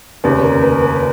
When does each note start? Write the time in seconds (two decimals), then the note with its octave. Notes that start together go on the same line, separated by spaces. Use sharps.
0.24 F1 D#2 C#3 B4
0.43 A#4
0.63 B4
0.82 B4